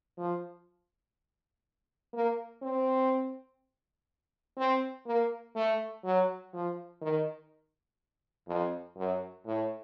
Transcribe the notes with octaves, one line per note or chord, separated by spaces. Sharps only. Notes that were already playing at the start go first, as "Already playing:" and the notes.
F3
A#3
C4
C4
A#3
A3
F#3
F3
D#3
F2
F#2
A2